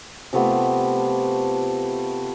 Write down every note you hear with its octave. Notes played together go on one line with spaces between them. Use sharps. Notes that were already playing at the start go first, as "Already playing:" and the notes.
C3 F3 A3 B3